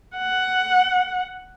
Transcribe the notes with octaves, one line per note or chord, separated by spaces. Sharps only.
F#5